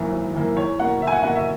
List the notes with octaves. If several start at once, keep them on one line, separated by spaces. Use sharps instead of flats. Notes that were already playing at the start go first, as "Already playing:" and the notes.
Already playing: G#1 F#2 E3 A#3
G#1
F#2 E3 A#3
E2 C#5
B2 A#3 F#5
E2 E5
G#5
F#5
B2 A#3 F#5
E5